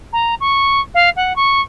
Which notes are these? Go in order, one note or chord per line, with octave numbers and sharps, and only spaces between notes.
A#5
C#6
F5
F#5
C#6